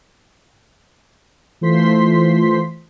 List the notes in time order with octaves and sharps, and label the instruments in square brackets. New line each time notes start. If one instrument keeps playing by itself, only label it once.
[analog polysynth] E3 A3 F4 C5 C6 B6